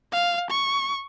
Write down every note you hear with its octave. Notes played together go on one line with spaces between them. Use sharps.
F5
C#6